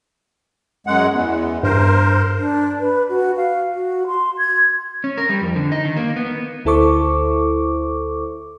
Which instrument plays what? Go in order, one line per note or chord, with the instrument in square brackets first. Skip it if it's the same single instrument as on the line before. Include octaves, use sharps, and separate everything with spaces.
[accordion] F#2 G#3 F#5
E2
[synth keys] G2 [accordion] A#4 C5
[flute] D4
B4
F#4
F5
F#4
C6
G#6
[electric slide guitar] C#4
A#4
G3
F2
D3
D#4
D#3
A#3
B3
[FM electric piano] D2 E4 A4 C5 C#6 D6